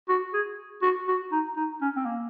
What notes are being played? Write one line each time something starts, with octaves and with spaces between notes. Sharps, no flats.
F#4
G#4
F#4
F#4
D#4
D#4
C#4
C4
A#3